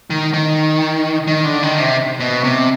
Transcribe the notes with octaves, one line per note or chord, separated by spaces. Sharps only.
D#3
D#3
D#3
D3
D#3
C3
B2
C3